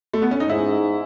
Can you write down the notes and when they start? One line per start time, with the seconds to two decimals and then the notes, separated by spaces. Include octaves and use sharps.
0.14 A3
0.22 B3
0.31 C#4
0.40 D#4
0.49 G#2 E4